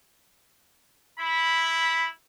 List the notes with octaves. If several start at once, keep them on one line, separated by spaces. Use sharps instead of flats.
E4 B5